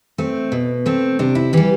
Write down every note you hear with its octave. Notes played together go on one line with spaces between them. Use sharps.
A3 C4
B2
A3 C4
C3 D4
E4
E3 G3 G4